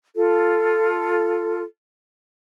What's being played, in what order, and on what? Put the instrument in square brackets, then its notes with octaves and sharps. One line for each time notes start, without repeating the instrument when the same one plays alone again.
[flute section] F4 A4